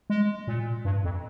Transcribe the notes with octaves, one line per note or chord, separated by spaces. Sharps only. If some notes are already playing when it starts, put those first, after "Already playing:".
G#3
A#2
G2
F2